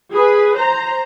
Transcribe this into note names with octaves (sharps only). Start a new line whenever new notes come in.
G#4 B4
C5 A#5